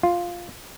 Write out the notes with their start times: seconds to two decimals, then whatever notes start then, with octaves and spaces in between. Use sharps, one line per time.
0.03 F4